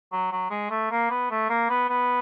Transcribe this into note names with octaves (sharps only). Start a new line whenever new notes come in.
F#3
F#3
G#3
A3
A#3
B3
A3
A#3
B3
B3